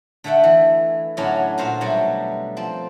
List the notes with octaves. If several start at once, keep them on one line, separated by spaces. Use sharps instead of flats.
D3 A3 E5 F#5 G5
E3
A2 D3 F#3 C#4 D4 E4
A#2 F#4 C5 F5
B2 F#3 G3 A3
F3 C4